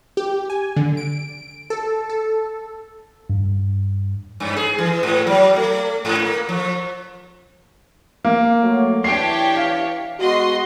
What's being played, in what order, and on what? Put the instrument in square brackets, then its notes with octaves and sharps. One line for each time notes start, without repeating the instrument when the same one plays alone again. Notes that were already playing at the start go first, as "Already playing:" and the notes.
[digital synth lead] G4
G#5
D3
D7
A4
A4
[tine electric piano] G2
[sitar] G2
G#4
E3
G#2
F#3
A3
G#2
A#3
F3
[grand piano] A#3
[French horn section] F#3 A3
[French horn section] E3 [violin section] D4 G4 C#5 [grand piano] C7 D7
[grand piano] F5
[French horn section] G#3 B3 F#4 [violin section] D#5 C6